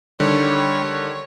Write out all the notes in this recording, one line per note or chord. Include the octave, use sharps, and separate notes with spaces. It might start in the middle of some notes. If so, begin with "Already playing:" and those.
D3 D#3 G3 C#5